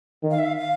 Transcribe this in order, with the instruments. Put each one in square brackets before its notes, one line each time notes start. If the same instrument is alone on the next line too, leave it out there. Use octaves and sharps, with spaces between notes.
[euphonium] D#3
[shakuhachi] F5
E5
F5
F5